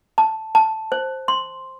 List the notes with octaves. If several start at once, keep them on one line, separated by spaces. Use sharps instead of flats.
A5
A5
C5
C6